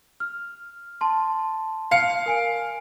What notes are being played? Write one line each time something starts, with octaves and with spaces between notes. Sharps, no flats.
F6
A5 C6
F5 C#7
A#4 G#5 D7